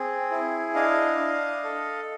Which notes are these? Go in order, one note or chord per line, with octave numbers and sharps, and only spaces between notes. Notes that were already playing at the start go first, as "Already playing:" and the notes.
Already playing: C4 G#4
E4
D4 D#5 F5
D4
A4